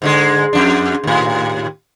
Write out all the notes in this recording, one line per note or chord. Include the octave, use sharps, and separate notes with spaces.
G#2 D3 G#3
F2 D4
D#2 A2